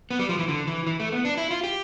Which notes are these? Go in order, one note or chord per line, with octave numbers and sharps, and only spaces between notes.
B3
G3
F3
E3
D3
E3
E3
A3
B3
D4
E4
F4
G4